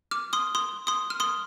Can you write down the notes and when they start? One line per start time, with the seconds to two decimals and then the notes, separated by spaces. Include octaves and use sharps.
0.11 D6 F6
0.33 C6 D#6
0.55 C6 D#6
0.87 C6 D#6
1.10 F6
1.20 C6 D#6